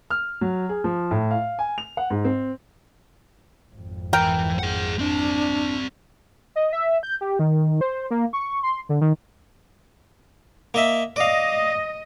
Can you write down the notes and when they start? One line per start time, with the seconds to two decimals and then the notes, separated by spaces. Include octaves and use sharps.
0.10 F6
0.41 F#3
0.69 G#4
0.84 F3
1.11 A2
1.31 F5
1.59 G#5
1.78 F7
1.97 F#5
2.10 G#2
2.25 C4
3.73 G#1 F2
4.13 E3 A#4 G5
4.59 G#4 F#5
4.99 C4 D4 D5
6.56 D#5
6.73 E5
7.03 G6
7.21 G4
7.39 D#3
7.81 C5
8.11 A#3
8.33 C#6
8.63 C6
8.89 D3
9.01 D#3
10.74 A#3 D#5 E5
11.16 D5 D#5 F5